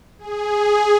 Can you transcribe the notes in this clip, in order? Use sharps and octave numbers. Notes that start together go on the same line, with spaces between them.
G#4